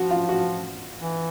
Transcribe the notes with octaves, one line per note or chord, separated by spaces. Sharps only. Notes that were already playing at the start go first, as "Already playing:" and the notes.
Already playing: F3 F#4
F4
F#4
E3